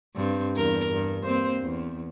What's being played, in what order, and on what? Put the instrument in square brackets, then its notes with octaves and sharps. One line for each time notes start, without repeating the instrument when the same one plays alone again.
[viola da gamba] G2 C4
E2 G2 A#4
G2
A#3 C4 C5
E2